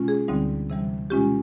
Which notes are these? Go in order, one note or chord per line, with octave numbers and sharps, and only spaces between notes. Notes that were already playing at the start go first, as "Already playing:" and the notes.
Already playing: B2 G#3 C#4 F4
G#4
D2 D3 G3 C4 D#4
C3 E3 G3
B2 G#3 C#4 F4 G4